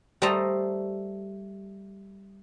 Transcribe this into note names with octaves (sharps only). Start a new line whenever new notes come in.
G3 A3 C5 D#5 A5 A#5